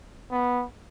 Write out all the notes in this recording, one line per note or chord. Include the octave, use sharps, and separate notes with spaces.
B3